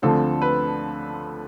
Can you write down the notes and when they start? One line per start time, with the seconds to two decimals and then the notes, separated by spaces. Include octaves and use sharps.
0.02 D2 D3 F3 A3 C4 A4
0.42 B4